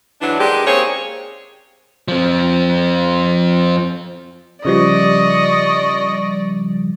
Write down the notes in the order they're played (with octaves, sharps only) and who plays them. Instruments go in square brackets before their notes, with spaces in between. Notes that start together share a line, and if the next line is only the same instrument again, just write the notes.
[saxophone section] G#2 E3 F#3 D4
D#3 G#3 D4 G4
A#3 C4 C#4 G#4 C5 C#5
[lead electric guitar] F3 C4
[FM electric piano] C#3 F3 G3 [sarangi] D5 [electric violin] D#5 C#6